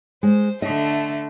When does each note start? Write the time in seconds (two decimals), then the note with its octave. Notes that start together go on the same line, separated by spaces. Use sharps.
0.23 G#3 C5
0.62 D3 A3 D#5